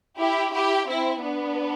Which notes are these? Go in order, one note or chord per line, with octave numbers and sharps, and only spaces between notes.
E4 G4
E4 G4
C4 E4
B3 D4